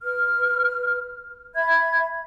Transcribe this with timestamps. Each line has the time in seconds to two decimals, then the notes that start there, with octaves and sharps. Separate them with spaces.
0.02 B4 F6
1.55 E5 B5 G#6